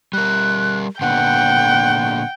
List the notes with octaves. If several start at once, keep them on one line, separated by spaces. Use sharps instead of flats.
G3 A#4 F#6
A#2 D3 B3 F#5 G5